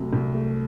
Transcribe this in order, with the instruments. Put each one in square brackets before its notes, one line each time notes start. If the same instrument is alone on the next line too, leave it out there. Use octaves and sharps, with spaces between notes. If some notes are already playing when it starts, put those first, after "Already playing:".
Already playing: [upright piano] C2 C3 F#3 A3
C2
A3